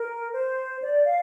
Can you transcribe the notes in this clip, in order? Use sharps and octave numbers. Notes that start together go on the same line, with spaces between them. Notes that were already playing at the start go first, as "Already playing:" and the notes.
Already playing: A#4
C5
D5
F5